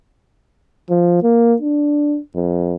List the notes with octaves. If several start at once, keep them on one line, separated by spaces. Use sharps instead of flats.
F3
A#3
D4
F2